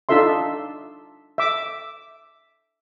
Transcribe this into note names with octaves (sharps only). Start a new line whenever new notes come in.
D4 D#4 F4 A4 E5 C6
E5 D6